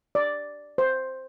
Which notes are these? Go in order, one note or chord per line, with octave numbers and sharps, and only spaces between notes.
D5
C5